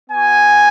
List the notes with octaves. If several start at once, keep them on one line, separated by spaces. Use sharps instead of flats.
B3 F#4 G#5